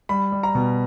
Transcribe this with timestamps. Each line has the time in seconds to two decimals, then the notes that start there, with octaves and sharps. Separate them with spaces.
0.09 G3 B5
0.32 G3
0.43 A#5
0.55 B2